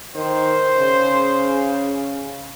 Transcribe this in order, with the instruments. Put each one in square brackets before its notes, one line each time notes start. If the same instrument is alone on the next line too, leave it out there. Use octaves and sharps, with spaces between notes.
[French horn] D#3 [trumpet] C5
[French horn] C#3